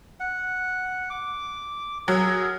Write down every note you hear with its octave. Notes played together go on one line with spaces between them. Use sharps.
F#5
D6
F#3 G#4 A#4